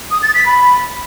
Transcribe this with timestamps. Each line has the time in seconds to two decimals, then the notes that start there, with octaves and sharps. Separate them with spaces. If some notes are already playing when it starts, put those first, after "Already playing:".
0.11 D#6
0.23 A6
0.34 B6
0.46 B5